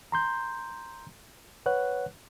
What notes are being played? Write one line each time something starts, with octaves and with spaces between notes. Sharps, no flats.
A#5 C6 G6
B4 C#5 F#5 F#6